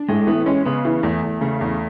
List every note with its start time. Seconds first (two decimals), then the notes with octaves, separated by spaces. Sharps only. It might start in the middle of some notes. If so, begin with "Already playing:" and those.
Already playing: D4
0.09 A2 G#3
0.27 E3 B3
0.46 G#3 C#4
0.65 C#3 B3
0.85 E3
1.03 E2 A3
1.22 E2
1.41 C#3 A3
1.61 E2